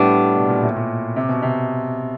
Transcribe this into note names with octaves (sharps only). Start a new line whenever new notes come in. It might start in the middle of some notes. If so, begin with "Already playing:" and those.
Already playing: A2 G3 B3 D4
B2
A#2
A2
A#2
C3
B2
C3